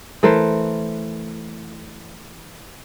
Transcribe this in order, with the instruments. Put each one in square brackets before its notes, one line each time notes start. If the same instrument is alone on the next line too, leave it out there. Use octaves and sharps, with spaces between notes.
[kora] E3 A3 A#4 C5